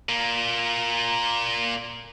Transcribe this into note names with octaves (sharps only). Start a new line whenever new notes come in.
A#2 A#3